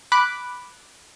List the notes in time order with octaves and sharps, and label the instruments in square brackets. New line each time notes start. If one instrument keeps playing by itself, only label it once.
[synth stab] B5 D6 F#6